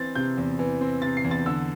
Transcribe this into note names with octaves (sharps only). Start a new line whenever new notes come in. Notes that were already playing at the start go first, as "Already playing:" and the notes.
Already playing: E3 C4 A6
C3 G6
E2
E3
C4
C3 A6
C7
E2
A6
D3 E6